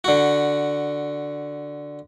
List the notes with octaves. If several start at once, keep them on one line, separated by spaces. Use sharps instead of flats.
D3 F#4